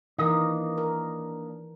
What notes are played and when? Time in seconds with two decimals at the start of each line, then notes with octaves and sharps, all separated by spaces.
0.19 D#3 E3 A#3 D4 A#4 D#5
0.78 A#4